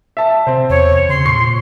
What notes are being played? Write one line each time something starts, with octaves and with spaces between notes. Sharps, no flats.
E5 A5
C3 C4 C5
E2 C#5
C#3 C6
A#2 C#6 C7